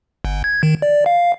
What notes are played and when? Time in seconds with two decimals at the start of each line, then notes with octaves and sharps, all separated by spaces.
0.25 G1
0.44 G#6
0.63 D#3
0.82 D5
1.06 F5